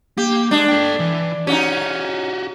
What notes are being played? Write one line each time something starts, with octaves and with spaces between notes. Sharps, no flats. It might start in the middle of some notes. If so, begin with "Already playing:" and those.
A#3 G4
G#3 D4
A4 G5
E3
C#4 D#4 F#4 G4